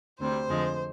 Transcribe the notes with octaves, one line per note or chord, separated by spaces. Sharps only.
D2 C3 G3 C5
F2 D3 F3 G#3